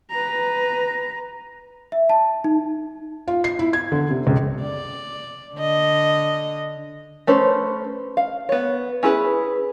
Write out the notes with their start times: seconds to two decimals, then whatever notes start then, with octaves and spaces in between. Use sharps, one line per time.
0.11 B4 A#5
1.92 E5
2.09 A5
2.44 D#4
3.28 F4
3.44 C7
3.59 E4
3.73 G#6
3.92 D3
4.10 C3
4.27 C#2
4.62 D5
5.55 D3 D#5
7.27 A3 C#4 B4 C5
8.17 F5
8.49 B3 C#5
9.03 C#4 E4 G#4 B4